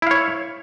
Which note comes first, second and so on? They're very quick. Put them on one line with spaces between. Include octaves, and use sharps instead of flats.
E4 F5 C#5